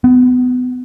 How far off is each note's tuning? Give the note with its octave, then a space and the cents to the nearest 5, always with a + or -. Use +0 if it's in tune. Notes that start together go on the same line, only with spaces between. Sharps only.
B3 +25